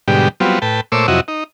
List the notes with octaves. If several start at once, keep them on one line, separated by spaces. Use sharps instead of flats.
G#2 B2 D3 G3 G4
F#3 G3 B3 C4 F4
A2 B4 G5 A5
A#2 A3 C5 C#5 D6 E6
F2 C3 F#3 E4 F#4 D#5
D#4